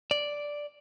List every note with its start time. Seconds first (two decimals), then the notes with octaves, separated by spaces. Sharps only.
0.11 D5